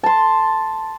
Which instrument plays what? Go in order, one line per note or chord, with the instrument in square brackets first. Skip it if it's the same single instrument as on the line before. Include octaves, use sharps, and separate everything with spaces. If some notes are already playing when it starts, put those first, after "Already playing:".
[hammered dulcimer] A5 C6